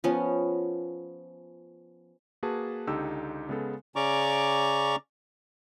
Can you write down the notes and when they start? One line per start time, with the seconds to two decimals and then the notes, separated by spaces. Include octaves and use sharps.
0.04 F3 B3 C#4
2.43 A#3 F#4 G#4 B4 A5
2.87 C#2 D3 D#4 G4 E6
3.49 C#3 G#3 B3 A4
3.96 C#3 C#4 D5 A#5 C#6 D6